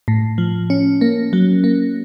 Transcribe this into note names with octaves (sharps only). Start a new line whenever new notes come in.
A2
F3
C#4
A#3
F#3
A#3